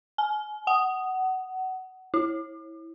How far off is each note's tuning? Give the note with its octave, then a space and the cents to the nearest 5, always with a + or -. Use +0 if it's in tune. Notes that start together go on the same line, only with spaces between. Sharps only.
G#5 +35
F#5 +20
E4 -10